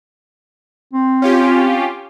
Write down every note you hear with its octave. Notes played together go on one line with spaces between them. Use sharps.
C4
C#4 F4 G4